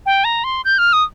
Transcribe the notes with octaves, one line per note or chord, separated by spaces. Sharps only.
G5
A#5
C6
G6
F6
D#6